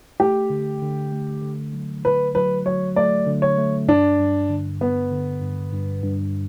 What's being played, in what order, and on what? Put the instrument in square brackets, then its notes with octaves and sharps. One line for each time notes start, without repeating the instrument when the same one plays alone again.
[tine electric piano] A3 [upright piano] G4
[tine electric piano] D3
D3
A3
D3
F#3
[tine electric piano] D3 [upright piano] B4
[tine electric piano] F#3 [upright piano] B4
[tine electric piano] F#3 [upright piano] C#5
[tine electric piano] A3 [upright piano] D5
[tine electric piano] D3
[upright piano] C#5
[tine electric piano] A3
[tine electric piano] G2 [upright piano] D4
[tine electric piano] G2
D3
[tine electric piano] G2 [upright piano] B3
[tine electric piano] D3
G2
G2
G2